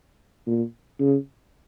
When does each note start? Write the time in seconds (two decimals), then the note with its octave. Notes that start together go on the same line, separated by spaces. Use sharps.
0.47 A#2
1.00 C#3